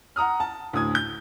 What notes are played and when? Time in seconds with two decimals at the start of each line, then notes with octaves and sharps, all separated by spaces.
0.16 F#5 A#5 D#6 F6
0.40 A5
0.73 D2 A2 D#6 G#6
0.95 G6